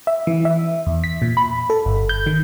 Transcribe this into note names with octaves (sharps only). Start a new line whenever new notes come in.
E5
E3
E5
E2
B6
A#2
B5
A4
G1
G6
D#3